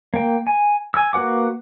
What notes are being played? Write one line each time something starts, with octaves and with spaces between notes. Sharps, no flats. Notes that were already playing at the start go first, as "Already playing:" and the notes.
A#3 G5
G#5
G#5 E6
A#3 F#4 B4 F#5 D6